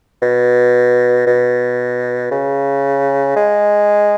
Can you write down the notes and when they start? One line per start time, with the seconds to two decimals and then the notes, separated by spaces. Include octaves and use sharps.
0.22 B2
1.27 B2
2.31 C#3
3.36 G#3